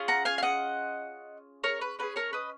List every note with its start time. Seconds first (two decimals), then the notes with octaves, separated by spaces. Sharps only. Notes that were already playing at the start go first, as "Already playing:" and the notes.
Already playing: C#4 F4 G#4
0.08 F#5 A#5
0.25 F5 G#5
0.38 F5
0.43 D#5 F#5
1.64 A#4 C#5
1.81 B4
1.99 C#4 F4 G#4 B4
2.16 A#4 C#5
2.33 B4 D#5